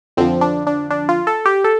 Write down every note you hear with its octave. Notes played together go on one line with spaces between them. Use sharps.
F2 D3 F3 C4
D4
D4
D4
F4
A4
G4
A4